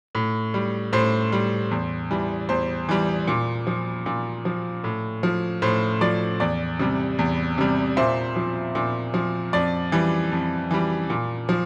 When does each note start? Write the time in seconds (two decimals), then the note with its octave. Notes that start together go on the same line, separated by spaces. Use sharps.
0.15 A2
0.54 G3
0.93 A2 C5
1.32 G3
1.71 E2
2.11 E3 G3
2.49 E2 C5
2.89 E3 G3
3.28 A#2
3.67 F3
4.06 A#2
4.45 F3
4.84 A2
5.23 F3
5.62 A2 C5
6.01 F3 D5
6.40 E2 D5
6.79 C3 G3
7.19 E2
7.58 C3 G3
7.97 A#2 C5 E5
8.36 F3
8.75 A#2
9.14 F3
9.53 F2 D5
9.92 E3 G3
10.32 F2
10.71 E3 G3
11.10 A#2
11.49 F3